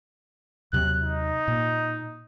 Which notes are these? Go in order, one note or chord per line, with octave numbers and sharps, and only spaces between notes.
D#2 C3 F#3 F#6
D#4
A#2